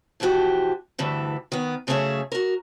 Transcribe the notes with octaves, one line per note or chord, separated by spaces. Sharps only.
B2 E3 F3 F#4 G4
D2 G2 D3 E3 E5
D#3 B3
F#2 C#3 A3 C#4 G#4 E5
F#4 A#4